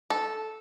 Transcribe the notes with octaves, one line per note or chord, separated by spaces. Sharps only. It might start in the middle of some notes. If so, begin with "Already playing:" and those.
A4